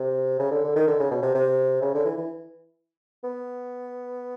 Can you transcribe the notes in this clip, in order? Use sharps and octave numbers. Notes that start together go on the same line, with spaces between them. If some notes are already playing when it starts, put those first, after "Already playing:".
Already playing: C3
C#3
D3
D3
D#3
D3
C#3
B2
C3
C3
C#3
D3
E3
E3
B3